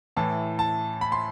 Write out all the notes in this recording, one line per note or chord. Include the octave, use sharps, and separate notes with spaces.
A2 E3 A5
A5
B5
C6